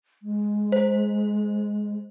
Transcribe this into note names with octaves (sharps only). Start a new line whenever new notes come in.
G#3
C5